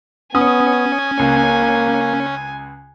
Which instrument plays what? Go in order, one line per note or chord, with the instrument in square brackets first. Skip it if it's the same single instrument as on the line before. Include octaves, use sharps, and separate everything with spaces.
[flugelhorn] B3 [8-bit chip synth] C#4 [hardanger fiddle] G#5 [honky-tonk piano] D#6
[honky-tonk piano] C#2 [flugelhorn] A#3